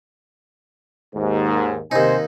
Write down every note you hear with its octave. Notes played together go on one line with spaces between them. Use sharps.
D#2 G#2
D#2 C3 D#4 C5 G#5